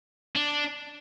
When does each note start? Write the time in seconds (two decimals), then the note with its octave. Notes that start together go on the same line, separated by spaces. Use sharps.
0.35 D4